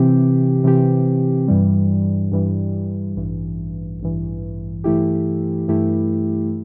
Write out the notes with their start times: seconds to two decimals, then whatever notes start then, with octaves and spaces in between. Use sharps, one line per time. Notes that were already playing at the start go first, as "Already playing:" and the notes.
Already playing: C3 E3 C4 G4
0.64 C3 E3 C4 G4
1.48 G2 E3 G3
2.32 G2 E3 G3
3.16 A1 G2 E3
4.00 A1 G2 E3
4.84 G2 E3 A3 E4 G4
5.68 G2 E3 A3 E4 G4